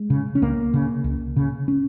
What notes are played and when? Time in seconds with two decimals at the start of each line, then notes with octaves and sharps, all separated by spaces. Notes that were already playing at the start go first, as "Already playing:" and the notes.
Already playing: G#3
0.10 C#3
0.35 C#4
0.42 C#2 A#3
0.74 C#3
1.04 C#2
1.36 C#3
1.68 C#4